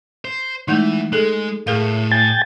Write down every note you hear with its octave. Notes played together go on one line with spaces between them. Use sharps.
C5
E3 G#3 A3 D#4
G#3 G#4 A4
A2 G#4 A#4 F5
G5 G#5 A6